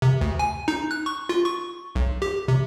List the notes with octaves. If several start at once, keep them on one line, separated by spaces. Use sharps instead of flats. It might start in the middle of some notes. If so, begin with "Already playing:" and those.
C3
D2
G#5
D#4
F#6
C#6
F4
C#6
B1
G4
C3